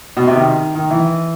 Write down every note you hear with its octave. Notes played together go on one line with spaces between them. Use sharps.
B2
C3
D#3
D#3
E3